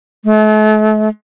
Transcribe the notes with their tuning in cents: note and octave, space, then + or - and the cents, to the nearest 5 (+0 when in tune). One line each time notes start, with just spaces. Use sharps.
A3 -40